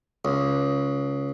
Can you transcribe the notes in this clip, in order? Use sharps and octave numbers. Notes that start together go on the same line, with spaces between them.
C#2